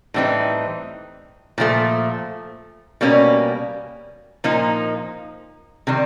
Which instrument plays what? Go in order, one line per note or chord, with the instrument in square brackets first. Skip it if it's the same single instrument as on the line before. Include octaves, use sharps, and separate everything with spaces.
[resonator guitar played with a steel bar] A2 E3 G3 C4 D#4
A#2 F3 A3
B2 G3 A#3 C#4
A#2 F3 A#3 D#4
C3 D#3 G3